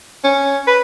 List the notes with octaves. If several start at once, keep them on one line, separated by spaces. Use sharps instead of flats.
C#4
B4